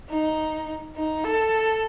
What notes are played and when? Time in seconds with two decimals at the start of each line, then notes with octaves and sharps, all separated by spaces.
0.10 D#4
0.96 D#4
1.24 A4